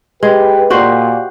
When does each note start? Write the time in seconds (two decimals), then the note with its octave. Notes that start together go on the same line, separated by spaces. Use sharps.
0.23 G#3 G4 B4
0.70 A#2 F#4 G4 C5